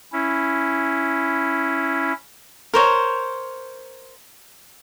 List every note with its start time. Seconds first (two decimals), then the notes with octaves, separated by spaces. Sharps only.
0.13 C#4 E4
2.74 A#4 C5 C#5